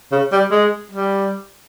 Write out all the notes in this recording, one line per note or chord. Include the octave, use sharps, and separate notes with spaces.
C#3
G3
G#3
G3